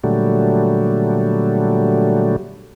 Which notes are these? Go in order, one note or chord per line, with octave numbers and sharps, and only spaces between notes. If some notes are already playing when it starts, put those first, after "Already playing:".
A#2 D3 F#3 G3 A3